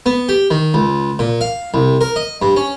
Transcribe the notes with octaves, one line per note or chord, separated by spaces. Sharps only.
B3
G4
D#3
C#2
A#2
F5
C2
A#4
D#5
G2
C#4